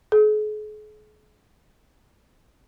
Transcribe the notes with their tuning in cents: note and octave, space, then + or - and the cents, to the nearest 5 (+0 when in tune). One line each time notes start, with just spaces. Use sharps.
G#4 +45